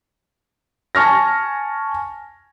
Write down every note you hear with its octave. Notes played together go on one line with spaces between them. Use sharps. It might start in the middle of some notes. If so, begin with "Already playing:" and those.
G#5 A5 C#6 F6 A#6